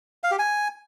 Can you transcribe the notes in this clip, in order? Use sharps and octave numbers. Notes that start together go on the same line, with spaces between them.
F5
G4
G#5